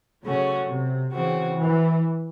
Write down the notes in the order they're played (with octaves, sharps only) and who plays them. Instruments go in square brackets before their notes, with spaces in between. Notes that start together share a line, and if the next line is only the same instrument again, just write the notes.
[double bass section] C#3 [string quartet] F#3 A3 C#4 F#4
[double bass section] C3
[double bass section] C#3 [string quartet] E3 C4 F#4
[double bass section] E3